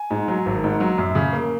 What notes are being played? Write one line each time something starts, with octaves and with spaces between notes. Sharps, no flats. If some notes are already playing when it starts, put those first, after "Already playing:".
Already playing: G#5
G#2
F#3
G#1
G#2
F#3
F#2
C#3
A#3